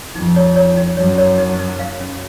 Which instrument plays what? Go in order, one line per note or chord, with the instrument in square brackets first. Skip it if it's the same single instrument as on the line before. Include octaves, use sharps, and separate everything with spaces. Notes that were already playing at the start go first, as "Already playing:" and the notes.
[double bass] F2 [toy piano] D#4
[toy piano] C#5
C#5
D#4
[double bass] F#2 [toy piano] C#5
[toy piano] C#5
D#4
D#4
F5
C#4